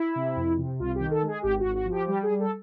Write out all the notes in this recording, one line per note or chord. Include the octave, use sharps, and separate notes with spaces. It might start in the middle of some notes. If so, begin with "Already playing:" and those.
Already playing: E4
C3
F2
C3
C2 F4
D#3 G4
A4
G#3 G#4
G#1 G4
G#1 F#4
F#4
F3
G4
G3 G4
G#4
G3
A4